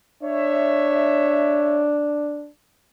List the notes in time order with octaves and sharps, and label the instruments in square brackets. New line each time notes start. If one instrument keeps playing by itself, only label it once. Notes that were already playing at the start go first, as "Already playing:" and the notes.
[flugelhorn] D4 [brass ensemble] C#5 E5